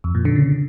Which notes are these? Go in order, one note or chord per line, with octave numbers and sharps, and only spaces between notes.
F2
A#2
D3
C#3